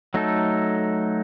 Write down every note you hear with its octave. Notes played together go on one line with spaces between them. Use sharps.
F#3 A3 D#4 A4